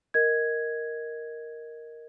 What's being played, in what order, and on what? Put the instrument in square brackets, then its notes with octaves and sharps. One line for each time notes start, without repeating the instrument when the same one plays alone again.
[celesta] A#4 D#5 G#6